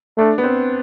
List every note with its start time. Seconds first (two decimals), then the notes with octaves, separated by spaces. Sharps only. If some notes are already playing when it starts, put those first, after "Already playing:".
0.18 A3 D4
0.38 B3
0.44 C4